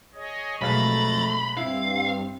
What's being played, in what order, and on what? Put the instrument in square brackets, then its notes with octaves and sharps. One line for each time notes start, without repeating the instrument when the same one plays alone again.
[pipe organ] G#4 C#5 D#5
[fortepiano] B1 G#3 F5 [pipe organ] F2 A#5 A6 [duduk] A3 [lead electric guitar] B5
[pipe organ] G2 [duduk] C4 [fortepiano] E4 [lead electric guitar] F5